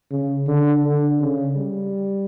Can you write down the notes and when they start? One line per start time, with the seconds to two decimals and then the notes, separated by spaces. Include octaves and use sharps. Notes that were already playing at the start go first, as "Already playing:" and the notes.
0.11 C#3
0.48 D3
0.84 D3
1.20 C#3
1.57 G3